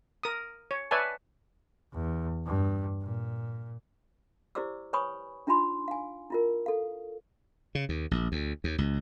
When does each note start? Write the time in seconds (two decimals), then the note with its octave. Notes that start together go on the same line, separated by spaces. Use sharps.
0.23 A#4 D#6
0.71 C#5
0.91 B4 C#5 D5 E5 G#5 A5
1.94 E2
2.45 G2
3.02 A#2
4.55 E4 G4 C5 D5 D6 E6
4.93 B4 C#5 G#5 B5 C#6 D#6
5.47 D4 D#4 F4 G#5 B5 C6
5.88 F5 G#5
6.30 E4 F4 A#4
6.66 A4 F5
7.75 C#3
7.89 D#2
8.11 A#1
8.32 D2
8.64 D#2
8.78 C#2